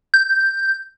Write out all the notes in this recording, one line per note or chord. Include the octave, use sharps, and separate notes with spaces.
G6